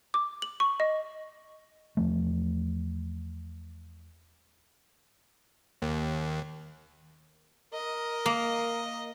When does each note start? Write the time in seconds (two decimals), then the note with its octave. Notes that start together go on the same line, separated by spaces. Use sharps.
0.14 D6
0.42 F#7
0.60 C#6
0.80 D#5
1.97 E2 F3 A3
5.82 D#2
7.74 A#4 D#5
8.26 A#3